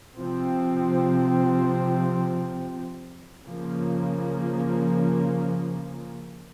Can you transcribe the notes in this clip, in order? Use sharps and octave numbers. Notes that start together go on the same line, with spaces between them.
C3 F3 C4
C#3 F3 A#3